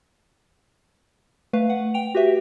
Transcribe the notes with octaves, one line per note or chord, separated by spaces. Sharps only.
A3 B4 F5
F#5
G5 D7 F7
F#4 G4 B4 E5